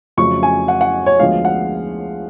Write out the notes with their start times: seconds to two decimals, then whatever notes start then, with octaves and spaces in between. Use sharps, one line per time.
0.17 F2 C#3 F#3 A3 C#4 C#6
0.43 G#5
0.68 F#5
0.81 F#5
1.06 C#5
1.19 D2 D3 F3 G#3 B3 F5
1.45 F#5